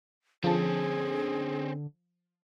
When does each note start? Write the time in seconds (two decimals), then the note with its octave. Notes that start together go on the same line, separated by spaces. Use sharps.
0.44 D3 F3 C4 C#4 G#4 A5